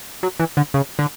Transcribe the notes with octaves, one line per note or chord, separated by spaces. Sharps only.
F#3
E3
D3
C#3
D3